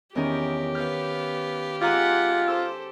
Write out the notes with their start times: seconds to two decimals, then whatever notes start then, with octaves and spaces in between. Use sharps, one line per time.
0.15 E2 D#3 C#4 G4 A#4
0.75 B3 F5 F6 G6
1.81 G#3 F4 F#5 G#5 A#5 D6
2.48 A4 C5 E6